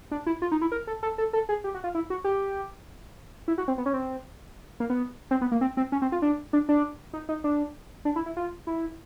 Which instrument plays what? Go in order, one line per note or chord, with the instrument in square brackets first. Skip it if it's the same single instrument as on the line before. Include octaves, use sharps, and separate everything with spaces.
[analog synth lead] D4
E4
F4
D#4
E4
A#4
A4
A4
A4
A4
G#4
G4
F#4
F4
E4
F#4
G4
E4
F#4
C4
B3
C#4
C4
A#3
B3
C4
B3
A#3
C4
C4
C#4
C4
F4
D4
D4
D4
D#4
D#4
D4
D4
E4
E4
F4
E4